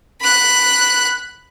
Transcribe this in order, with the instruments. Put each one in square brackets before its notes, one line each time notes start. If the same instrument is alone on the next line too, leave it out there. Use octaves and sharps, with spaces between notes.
[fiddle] B5 F#6